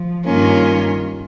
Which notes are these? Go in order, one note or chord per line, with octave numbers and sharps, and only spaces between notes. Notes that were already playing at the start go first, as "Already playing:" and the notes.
Already playing: F3
G2 D#3 A#3 C#4 F4